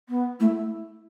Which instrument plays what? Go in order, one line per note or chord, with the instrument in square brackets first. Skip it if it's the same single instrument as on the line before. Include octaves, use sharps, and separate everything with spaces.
[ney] B3
[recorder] A3 [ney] E4